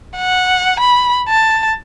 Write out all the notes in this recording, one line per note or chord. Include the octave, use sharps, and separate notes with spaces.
F#5
B5
A5